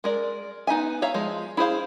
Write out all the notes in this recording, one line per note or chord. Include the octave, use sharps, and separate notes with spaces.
G#3 A#4 D5
B3 D#4 E5 G#5
C#5 E5 F5 A#5
F3 G#3
E4 G#4 C5 F5